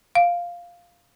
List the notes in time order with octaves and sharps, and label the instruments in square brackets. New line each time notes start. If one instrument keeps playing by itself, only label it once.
[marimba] F5